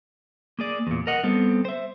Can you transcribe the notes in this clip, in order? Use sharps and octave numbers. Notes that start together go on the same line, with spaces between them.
A#3 G#4 D5
E2 A#2
A#4 D#5 F#5
G3 B3 C4 A4
C5 E5